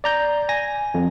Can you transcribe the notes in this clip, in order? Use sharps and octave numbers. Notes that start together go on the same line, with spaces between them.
D5 A#5 G6
G#5 A#6
F2